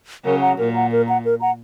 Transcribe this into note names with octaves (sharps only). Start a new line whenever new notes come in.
C#3 F#3 A#4
F#5 A#5
A#2 A#4
F#5 A#5
A#4
F#5 A#5
A#4
F#5 A#5